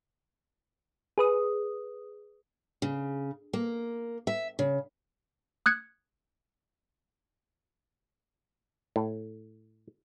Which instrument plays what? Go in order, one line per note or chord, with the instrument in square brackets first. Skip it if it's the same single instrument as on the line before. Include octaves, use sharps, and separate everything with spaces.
[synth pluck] G#4 B4 D#6
[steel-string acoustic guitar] C#3
A#3
E5
C#3
[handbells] D#6 F#6 G#6 C#7
[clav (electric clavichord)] A2